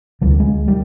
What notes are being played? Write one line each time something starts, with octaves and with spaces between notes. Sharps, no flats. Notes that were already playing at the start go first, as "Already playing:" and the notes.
D2 D3 G3
G#3
G3